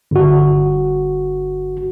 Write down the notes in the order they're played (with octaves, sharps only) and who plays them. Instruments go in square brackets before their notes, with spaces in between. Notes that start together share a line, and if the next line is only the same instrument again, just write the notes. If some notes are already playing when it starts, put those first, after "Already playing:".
[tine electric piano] G1 F#4